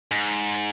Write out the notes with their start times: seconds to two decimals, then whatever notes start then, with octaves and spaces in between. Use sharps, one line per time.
0.11 G#2